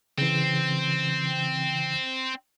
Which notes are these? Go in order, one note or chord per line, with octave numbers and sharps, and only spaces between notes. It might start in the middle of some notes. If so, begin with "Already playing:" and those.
C#3 E3 C4